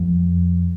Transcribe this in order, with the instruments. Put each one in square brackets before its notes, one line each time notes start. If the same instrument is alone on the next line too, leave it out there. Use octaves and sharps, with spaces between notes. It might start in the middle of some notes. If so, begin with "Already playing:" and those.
Already playing: [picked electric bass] F2